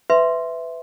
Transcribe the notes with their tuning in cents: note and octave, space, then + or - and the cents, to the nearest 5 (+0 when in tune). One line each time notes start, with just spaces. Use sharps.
B4 +25 E5 +0 C6 +0